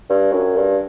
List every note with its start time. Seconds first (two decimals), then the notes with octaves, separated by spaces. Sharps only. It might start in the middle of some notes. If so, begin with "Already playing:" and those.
0.10 G2
0.32 F#2
0.56 G2